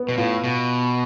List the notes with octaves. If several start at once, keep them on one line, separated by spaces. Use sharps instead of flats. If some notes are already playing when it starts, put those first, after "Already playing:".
Already playing: B3
B2
A2 F4
B2